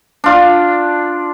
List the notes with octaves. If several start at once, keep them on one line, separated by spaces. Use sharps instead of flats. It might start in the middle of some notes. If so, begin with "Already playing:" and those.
D4 F4